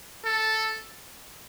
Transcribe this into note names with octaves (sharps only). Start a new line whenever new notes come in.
A4